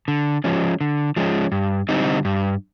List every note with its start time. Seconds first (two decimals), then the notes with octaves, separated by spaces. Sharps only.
0.08 D3
0.44 F3 G#3 C#4
0.81 D3
1.16 F3 G#3 C#4
1.52 G2
1.89 D3 G3 C4 D#4
2.25 G2